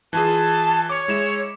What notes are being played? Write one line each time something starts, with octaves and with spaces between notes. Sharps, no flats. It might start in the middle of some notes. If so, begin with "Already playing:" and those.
E3 F4 G#4 A5
C#5 D6
G#3 E4 E7